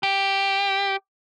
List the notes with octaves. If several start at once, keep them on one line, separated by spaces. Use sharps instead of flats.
G4